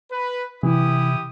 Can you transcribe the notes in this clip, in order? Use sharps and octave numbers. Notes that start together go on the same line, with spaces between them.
B4
C3 E3 E4 G4 D#6